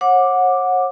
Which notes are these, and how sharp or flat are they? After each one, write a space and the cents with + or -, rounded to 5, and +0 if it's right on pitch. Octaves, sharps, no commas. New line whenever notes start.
C#5 -40 F#5 -20 D6 +0